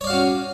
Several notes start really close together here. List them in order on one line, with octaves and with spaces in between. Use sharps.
C#5 D5 F5 F#4 C#4